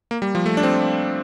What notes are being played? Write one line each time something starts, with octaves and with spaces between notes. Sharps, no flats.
A#3
G3
F3
A3
D4
C4